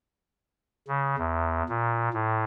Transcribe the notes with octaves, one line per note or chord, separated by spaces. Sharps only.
C#3
E2
A#2
A2